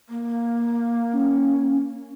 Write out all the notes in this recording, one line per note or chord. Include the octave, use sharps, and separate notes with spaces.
A#3
C#4